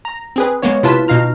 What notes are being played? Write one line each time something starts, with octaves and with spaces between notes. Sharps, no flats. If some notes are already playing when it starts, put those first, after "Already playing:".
A#5
C4 G#4 B4
G#3 A#3 B3 C#5
C3 E4 F4 B4 A5 B6
B2 D#4 F5 A#5 F6